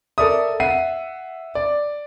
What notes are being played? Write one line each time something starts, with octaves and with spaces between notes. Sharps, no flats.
A4 A#4 D5 E5 D#6
E5 F#5 C7 D#7
D5